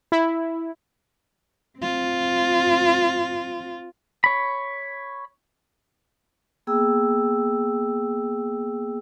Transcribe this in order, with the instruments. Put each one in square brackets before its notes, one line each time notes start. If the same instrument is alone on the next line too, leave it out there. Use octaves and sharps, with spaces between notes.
[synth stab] E4
[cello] C4 F4
[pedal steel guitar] C#5 B5
[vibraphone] A#3 B3 G#4 G5 E6